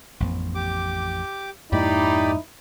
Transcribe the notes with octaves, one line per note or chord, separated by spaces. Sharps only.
A1 F2 B3
G4 D6
F2 G#2 A#3 D#4 E4 G4 D5 B5